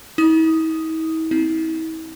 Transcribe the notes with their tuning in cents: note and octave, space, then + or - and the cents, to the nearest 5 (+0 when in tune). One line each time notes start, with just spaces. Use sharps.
E4 -45 D#6 +0
C4 +0 E4 -40